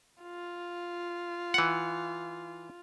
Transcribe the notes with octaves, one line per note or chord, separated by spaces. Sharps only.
F4
E3 F#5